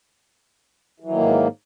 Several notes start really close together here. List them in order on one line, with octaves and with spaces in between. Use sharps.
E3 F#3 D#3 A#3 G#2